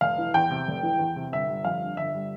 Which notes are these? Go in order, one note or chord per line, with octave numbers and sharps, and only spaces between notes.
F1 F5
E3
E2 G5
C3
F1
E3
E2
C3
G1 E5
G3
F2 F5
D3
G1 E5
G3